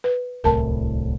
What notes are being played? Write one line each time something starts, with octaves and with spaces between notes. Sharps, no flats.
B4
D1 C2 A2 A#4 A5